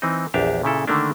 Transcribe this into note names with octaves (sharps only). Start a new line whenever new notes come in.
E3 C4 D#4
A#1 E2 D4 G4 E5 F5
A#2 C#3 E4 A4
D3 D#3 A3 A#3 D4